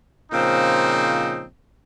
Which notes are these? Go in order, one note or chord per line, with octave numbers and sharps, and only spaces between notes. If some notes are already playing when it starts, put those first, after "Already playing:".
A#2 C#3 F3 C4 D#4